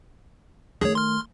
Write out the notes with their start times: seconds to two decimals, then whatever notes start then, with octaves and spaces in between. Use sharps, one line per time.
0.81 D#3 A3 G#4 C#5
0.95 C6 F6